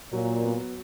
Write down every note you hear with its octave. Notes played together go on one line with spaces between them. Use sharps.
A#2 F#3
B3